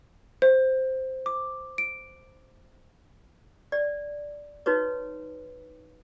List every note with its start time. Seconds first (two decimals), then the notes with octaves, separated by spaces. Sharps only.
0.42 C5
1.26 D6
1.78 D7
3.72 D5
4.66 D#4 F#4 B4 C#5